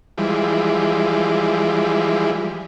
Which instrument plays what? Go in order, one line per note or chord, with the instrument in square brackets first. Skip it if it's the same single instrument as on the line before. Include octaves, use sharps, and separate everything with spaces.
[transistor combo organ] E3 F3 G3 G#3